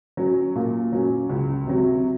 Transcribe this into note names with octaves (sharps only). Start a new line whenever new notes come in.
F#3 C#4
A#2
F#3 C#4
C#2
C3 F#3